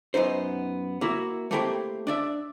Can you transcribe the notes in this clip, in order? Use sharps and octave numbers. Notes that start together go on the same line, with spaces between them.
F#2 B3 D#4 C5
A#3 E4 F#4
A3 A#3 C4 E4 G4 G5
D4 D5 E5